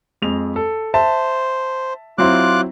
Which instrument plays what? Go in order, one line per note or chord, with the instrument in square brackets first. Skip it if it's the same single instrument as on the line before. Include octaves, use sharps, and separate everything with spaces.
[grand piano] F2 G#3 F7
A4
[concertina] C5 [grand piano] E5 A5
[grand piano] F#3 C4 E4 [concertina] F4 D6 F#6